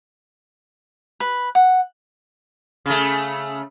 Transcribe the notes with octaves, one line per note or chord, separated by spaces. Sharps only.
B4
F#5
C#3 A3